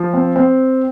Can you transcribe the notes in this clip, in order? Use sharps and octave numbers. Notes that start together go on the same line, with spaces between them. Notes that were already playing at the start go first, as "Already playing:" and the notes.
Already playing: F3
C4
C4